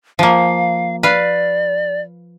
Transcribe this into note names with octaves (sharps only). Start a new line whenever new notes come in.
F3 A#3 F5
B4 D5 F5